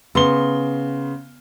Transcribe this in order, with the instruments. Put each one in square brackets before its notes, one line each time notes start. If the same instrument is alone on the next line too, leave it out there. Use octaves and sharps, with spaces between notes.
[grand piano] C#3 C6 G7 [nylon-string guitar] B3